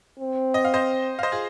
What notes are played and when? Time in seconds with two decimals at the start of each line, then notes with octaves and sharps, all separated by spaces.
0.19 C4
0.54 D#5
0.65 F5
0.74 C5 D#5
1.19 F5
1.23 C5 D#5
1.32 F4 G#4